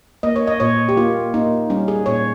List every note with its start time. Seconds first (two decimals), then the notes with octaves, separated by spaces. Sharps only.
0.23 A#3 D#5
0.36 C#5
0.47 D#5
0.60 A#2 C#5
0.89 G4
0.97 A#3 F4
1.34 A#3 D#4
1.70 G3 C#4
1.88 G#4
2.06 A#2 C#5